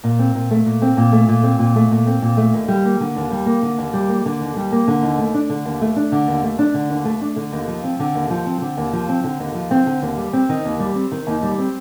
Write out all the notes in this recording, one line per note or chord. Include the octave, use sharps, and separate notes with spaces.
A#2
C4
A#2
A3
A#2
C4
A#2
A3
A#2
C4
A#2
A3
A#2
C4
A#2
A3
D#2
G3
A#3
D3
D#2
G3
A#3
D3
D#2
G3
A#3
D3
D#2
G3
A#3
D3
D#2
A3
D4
D3
D#2
A3
D4
D3
D#2
A3
D4
D3
D#2
A3
D4
D3
D#2
F3
C4
D3
D#2
F3
C4
D3
D#2
F3
C4
D3
D#2
F3
C4
D3
D#2
G3
C4
D#3
D#2
G3
C4
D#3
D#2
G3
C4